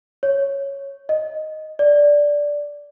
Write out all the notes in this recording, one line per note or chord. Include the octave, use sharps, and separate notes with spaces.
C#5
D#5
D5